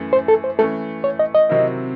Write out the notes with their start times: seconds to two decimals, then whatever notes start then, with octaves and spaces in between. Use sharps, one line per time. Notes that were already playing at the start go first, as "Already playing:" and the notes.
Already playing: F#2 E3 A3
0.13 C5
0.28 A4
0.44 C5
0.59 E3 A3 C#4 A4
1.04 C#5
1.19 D#5
1.34 D#5
1.49 C3 D#3 F#3 C4 E4